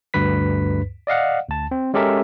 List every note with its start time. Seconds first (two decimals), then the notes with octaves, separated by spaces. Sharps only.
0.14 D2 G2 B4 B6
1.07 D5 D#5 F5 F#5
1.48 D2 A5
1.71 C4
1.94 G#3 C#4 G4 A4 A#4 E5